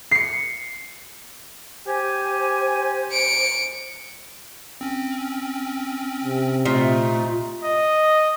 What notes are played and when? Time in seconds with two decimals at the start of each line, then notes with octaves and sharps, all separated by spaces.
0.11 C7 C#7
1.87 G4 C5 G#5
3.12 C#7 D7
4.81 C4 C#4
6.24 C3
6.65 A#2 A3 D#4 F4 E5
7.63 D#5